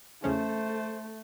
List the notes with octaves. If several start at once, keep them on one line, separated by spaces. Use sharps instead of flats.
E2 C#3 A3 C#4 C5